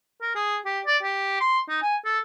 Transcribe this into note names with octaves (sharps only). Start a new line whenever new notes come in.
A#4
G#4
G4
D5
G4
C6
D#4
G#5
A4